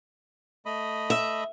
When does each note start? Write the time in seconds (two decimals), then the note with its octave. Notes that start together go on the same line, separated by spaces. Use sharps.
0.66 A3 D#5 B5
1.10 E5